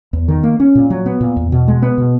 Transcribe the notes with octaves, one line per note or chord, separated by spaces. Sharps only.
E2
D#3
A#3
C#4
A#2
F#3
B3
A#2
E2
B2
G#3
B3
B2